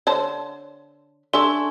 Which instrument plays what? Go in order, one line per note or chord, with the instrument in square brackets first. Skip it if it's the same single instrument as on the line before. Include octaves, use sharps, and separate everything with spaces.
[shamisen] D3 C5 A5 [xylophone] C#5
[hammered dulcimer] D4 [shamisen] A4 E5 [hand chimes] G#5 C#6 [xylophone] C6